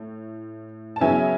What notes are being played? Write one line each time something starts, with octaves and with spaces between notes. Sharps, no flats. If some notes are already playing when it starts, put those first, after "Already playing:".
Already playing: A2
A5
C#3 F#3 B3 E5 G#5